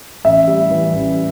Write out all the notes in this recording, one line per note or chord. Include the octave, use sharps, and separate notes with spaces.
A1 E5
G3
E3
A1